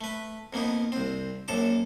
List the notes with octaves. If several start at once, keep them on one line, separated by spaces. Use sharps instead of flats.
A3 B4
F2 A#3 B3 D#4
C2 C4
A#1 F#2 A4 A5 D6